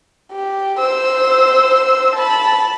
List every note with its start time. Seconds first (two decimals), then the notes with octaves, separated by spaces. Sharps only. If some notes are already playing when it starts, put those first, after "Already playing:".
0.32 G4
0.78 C5 E6
2.15 A5 B5